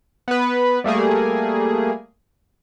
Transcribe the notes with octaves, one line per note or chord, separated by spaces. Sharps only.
B3 B4
G3 A3 A#3 G#4